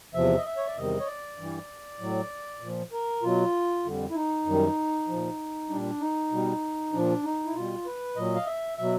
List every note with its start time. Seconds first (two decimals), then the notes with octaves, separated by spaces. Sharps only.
0.14 E2 C3 F3 E5
0.37 D#5
0.46 E5
0.57 C#5
0.67 D5
0.75 E2 C3 D#3 G3 D#5
1.00 C#5
1.07 D5
1.38 G2 E3 G3
1.99 A2 F#3
2.61 A#2 F3
2.92 A#4
3.22 B2 F#3 F4
3.85 F2 D3 G3
4.11 E4
4.15 D#4
4.46 F#2 D#3 G3
5.08 A#2 F3
5.69 A#2 G3 D4
6.00 D#4
6.32 B2 G3
6.93 A#2 F3 D4
7.24 D#4
7.46 E4
7.54 B2 G3 F4
7.86 B4
8.16 A#2 F#3 D#5
8.35 F5
8.46 E5
8.78 B2 F#3 E5